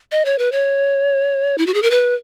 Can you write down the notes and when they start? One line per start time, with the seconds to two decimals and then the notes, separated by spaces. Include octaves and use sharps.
0.12 D#5
0.25 C#5
0.39 B4
0.52 C#5
1.58 E4
1.67 F#4
1.74 G#4
1.83 A#4
1.91 B4